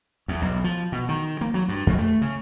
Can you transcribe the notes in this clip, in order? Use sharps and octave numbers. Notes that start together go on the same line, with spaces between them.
E2
B1
F3
B2
D#3
A#3
F#3
G2
F2
A3
C#3